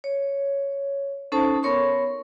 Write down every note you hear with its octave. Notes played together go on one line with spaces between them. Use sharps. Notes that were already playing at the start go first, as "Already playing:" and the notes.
C#5
C#4 D#4 A4 C5 A5
B3 A#4 C#5 C6 C#6